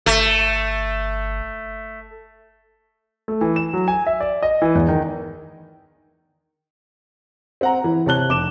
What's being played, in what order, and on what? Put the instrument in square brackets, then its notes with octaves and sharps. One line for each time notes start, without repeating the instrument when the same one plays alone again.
[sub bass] G1 [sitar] A3
[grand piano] A3
E3
E7
F#3
G#5
E5
D5
D#5
E3
E2
D#3
C4 F#5 A#5
E3
C3 C#5 A5 F#6 G7
F1 D6 E7